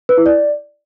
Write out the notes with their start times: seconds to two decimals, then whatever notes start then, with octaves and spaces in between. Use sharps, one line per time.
0.09 B4
0.17 E4
0.26 D5